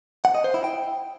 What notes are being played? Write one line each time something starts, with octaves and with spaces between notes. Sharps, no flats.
F#5
D#5
C5
E4
G5